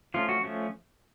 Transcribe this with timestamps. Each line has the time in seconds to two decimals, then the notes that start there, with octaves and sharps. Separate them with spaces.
0.14 F3 A3 C#4 F4
0.29 F#4
0.44 F3 A3 C#4